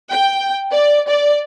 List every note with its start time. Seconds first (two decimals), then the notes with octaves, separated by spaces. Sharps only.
0.11 G5
0.72 D5
1.09 D5